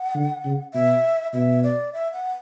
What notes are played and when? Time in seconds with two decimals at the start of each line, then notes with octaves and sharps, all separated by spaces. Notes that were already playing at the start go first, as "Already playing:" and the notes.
Already playing: F#5
0.15 D3
0.45 C#3
0.74 B2 E5
1.33 B2 E5
1.63 D5
1.93 E5
2.13 F#5